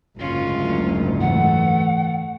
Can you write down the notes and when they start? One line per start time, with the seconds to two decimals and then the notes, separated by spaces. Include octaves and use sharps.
0.18 F#1 D2 G#2 G#3 C#4 F4
1.21 E3 A3 F#5